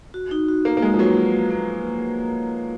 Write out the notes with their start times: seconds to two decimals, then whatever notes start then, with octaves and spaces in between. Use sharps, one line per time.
0.14 F#4
0.31 D#4
0.48 F#4
0.65 A#3 F#4
0.77 A#3
0.82 G#3 D#4
0.94 F3
0.99 F#3 B4
1.17 A#3
1.33 F#4
1.51 A#3